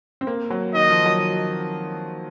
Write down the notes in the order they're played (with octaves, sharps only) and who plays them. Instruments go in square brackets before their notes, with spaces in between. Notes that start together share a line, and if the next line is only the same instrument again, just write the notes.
[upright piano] C4
A#3
F#3
[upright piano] D#3 [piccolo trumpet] D#5
[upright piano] F3
F#3